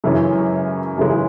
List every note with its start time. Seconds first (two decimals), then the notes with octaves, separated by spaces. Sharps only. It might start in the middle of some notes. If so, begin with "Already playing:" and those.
0.04 F#2 C#3 E3 G#3 C#4
0.98 F#2 C#3 E3 G#3 C#4